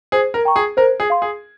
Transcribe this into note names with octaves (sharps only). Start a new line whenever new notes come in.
G#4 C5
A#4
G5 A#5 C#6
G#4
A#4 C5
G#4
F5 C6
G#4